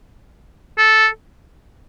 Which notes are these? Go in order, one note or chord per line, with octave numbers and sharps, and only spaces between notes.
A4